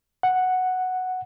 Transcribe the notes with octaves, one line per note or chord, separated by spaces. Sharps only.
F#5